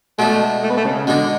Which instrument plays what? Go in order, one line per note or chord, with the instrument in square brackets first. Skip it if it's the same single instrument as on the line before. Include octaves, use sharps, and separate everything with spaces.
[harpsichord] B2 G#3 D4 [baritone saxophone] A3
[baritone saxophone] A3
B3
A3
C#3
[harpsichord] B2 G#3 D4 [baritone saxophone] D3